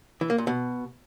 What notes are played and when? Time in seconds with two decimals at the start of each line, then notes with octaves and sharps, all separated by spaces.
0.21 E3
0.30 A#3
0.38 A#2
0.47 B2